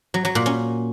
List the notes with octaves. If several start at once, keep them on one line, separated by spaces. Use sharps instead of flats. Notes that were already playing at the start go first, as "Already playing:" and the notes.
F#3
F#3
A#2
C#4